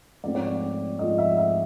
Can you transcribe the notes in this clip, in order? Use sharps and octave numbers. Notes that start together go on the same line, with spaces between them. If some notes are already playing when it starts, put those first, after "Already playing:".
G#2 F3 A3 C4 D5
C#5
D5
G#2 F3 A3 C4 D#5
E5
E5